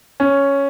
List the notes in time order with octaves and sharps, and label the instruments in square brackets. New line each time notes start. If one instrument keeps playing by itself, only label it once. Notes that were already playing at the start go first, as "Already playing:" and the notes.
[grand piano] C#4